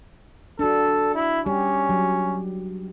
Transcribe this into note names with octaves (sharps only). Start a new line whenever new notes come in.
D4 F#4 A4
E4
G3 C#4 G4
F#3